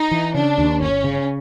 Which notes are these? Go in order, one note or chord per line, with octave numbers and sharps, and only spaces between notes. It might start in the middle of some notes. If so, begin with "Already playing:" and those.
Already playing: D#4
E3
C#3 D4
D#2
G1 C#4
C#3